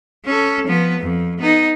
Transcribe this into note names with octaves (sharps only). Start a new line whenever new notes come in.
C#4 A4
F3 B3
F2
B3 D#4